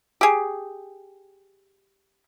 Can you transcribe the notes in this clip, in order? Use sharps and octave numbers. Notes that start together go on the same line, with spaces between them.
G4 G#4